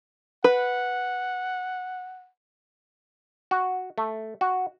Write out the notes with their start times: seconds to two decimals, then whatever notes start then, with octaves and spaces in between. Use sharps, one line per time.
0.44 B4 F#5
3.51 F#4
3.98 A3
4.41 F#4